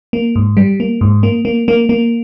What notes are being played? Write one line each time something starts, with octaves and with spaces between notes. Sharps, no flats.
A#3
G#2
G3
A#3
G#2
A#3
A#3
A#3
A#3